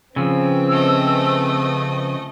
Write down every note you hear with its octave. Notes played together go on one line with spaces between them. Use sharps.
C#3 F3 C4 B4 E6
A3 D#5